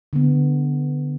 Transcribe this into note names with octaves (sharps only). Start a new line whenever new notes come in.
D3 B3